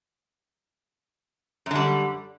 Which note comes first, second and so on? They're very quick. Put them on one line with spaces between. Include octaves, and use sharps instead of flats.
F#2 D3 G3